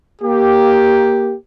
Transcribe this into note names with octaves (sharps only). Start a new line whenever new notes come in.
A#3 G4